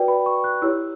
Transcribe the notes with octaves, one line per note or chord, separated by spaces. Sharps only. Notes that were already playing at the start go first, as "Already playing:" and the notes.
Already playing: F#4 B4 D5 G5
B5
C#6
F#6
E4 G4 C#5 E6